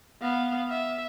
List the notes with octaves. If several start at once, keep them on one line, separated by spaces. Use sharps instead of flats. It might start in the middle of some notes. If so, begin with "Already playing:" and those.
B3 F5
E5